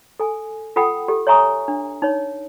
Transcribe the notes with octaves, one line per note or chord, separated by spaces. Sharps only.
A4 G#5
F4 A4 F#5 G5 B5 D#6
G4 A4
C#5 E5 G#5 A#5 C#6 D#6
D4
D#4 C#5